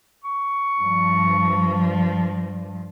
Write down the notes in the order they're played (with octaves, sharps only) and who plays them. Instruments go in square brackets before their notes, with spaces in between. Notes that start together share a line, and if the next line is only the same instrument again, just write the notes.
[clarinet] C#6
[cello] G2 F3